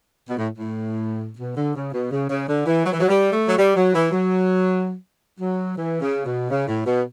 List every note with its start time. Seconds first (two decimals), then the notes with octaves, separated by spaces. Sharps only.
0.28 B2
0.38 A2
0.58 A2
1.39 B2
1.57 D3
1.75 C#3
1.92 B2
2.11 C#3
2.29 C#3
2.48 D3
2.66 E3
2.85 F#3
2.92 E3
3.00 F#3
3.08 G3
3.32 A3
3.48 F#3
3.57 G3
3.76 F#3
3.94 E3
4.12 F#3
5.40 F#3
5.77 E3
6.01 C#3
6.25 B2
6.50 C#3
6.68 A2
6.86 B2